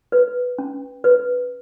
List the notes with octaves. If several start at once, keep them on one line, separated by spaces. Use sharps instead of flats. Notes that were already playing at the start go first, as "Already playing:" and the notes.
B4
C#4
B4